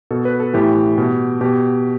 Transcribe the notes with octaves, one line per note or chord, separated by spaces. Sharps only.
B2 A4
B4
A4
A2 E3 G4
B2
B2 G4